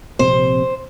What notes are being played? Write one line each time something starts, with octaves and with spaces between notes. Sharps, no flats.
A#1 C3 C4 C5